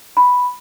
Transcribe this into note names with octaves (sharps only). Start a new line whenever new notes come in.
B5